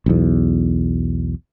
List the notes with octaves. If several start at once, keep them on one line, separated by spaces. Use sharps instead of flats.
B1 E2